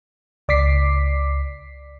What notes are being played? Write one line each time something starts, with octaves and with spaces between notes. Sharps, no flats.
C#2 D5 D6 B6 C7